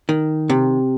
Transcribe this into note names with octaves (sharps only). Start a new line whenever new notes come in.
D#3
C3